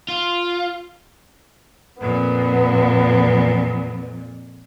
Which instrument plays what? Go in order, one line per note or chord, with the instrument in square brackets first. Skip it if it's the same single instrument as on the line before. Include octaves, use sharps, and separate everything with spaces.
[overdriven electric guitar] F4
[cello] F2 A#2 [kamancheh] B3